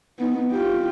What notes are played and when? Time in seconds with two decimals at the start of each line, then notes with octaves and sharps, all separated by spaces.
0.19 B3 D#4
0.52 F4 G4